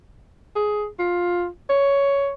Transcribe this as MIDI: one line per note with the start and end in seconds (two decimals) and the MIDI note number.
0.55 0.86 68
0.99 1.47 65
1.69 2.32 73